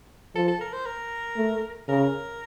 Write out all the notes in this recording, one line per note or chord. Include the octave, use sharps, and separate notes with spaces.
F3 A4
A4
A#4
C5
A#4
A3
C#3 A#4